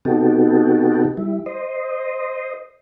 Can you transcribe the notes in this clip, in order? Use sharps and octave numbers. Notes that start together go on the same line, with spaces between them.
C3 B3 D#4 F#4 G4 A4
G3 E4
C5 D#5